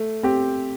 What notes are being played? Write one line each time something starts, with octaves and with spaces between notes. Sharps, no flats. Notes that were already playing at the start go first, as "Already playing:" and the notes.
Already playing: A3
C4 G4